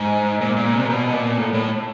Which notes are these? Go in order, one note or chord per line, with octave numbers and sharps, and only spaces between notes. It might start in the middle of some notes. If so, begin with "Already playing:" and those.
Already playing: G#2
A#2
A#2
C3
A#2
B2
A#2
A2
A2